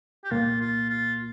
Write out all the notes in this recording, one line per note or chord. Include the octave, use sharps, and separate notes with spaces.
G4
C2 A#2 A#3 F4
F4
F4